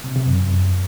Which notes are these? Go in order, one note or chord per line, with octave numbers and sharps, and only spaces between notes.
C3
C3
F#2